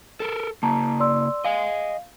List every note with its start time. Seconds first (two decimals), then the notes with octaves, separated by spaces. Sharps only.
0.20 A4 A#4
0.63 C#3 A#3 A5 A#5
1.00 D5 C6 E6
1.45 D#5 F5 G#5